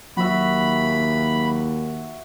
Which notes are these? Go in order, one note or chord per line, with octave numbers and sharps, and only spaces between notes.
D#2 F#3 F#4 E5 B5